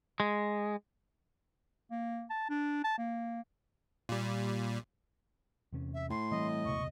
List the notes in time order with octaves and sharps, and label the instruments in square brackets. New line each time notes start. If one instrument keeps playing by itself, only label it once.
[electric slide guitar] G#3
[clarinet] A#3
A5
D4
A5
A#3
[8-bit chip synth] A#2 G3
[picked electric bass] E2 C3 C#4
[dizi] E5
[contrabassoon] A2 [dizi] C6
[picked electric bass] E3 G3 C4 [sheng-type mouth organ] D#5
[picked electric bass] F1 C#2 B2 [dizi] C#6